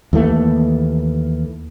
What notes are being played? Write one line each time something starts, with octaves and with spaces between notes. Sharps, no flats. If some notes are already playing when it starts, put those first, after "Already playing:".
D#2 E3 A3